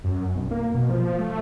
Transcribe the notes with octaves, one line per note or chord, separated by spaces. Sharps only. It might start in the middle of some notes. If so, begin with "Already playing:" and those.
F#2
B1
A#3
B2
F3
A3